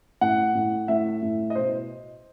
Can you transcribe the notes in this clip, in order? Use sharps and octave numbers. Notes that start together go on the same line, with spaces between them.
A2 F#5
A2
A2 E5
A2
D#5
B2 C5